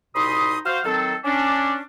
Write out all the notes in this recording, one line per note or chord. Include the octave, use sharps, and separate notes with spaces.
C2 B2 D#4 B5 C6 D#6
F#4 C5 F5
D#3 F#3 C4 A4
C#4 D4